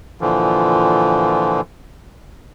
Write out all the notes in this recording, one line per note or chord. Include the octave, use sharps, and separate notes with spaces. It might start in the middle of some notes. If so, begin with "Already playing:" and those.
A#2 D3 E3 F3